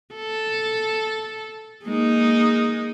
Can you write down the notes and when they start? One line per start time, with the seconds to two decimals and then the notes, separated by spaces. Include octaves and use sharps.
0.15 A4
1.84 G#3 A#3 D#4